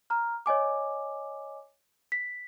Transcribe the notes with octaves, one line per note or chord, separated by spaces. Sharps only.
A#5 F6
C#5 D#5 G#5 D6
B6